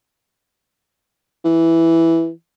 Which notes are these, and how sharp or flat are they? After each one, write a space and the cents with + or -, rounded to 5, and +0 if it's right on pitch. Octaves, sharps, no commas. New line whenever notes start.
E3 +0